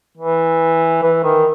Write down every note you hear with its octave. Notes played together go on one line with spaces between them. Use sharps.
E3
E3
D#3